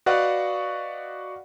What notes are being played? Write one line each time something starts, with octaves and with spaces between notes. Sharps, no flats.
F#4 B4 D5 D#5 F5 F#5